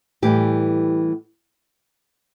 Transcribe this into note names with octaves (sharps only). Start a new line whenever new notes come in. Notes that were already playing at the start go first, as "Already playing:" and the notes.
A2 E3 G3 G4